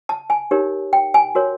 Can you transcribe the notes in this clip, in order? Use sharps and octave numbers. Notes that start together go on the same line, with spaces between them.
A5
G#5
D#4 G4 A#4 C#5
G5
G#5
F#4 A#4 C#5